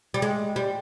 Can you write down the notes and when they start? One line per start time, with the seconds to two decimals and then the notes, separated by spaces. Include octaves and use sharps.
0.14 G3
0.22 G#3
0.56 G3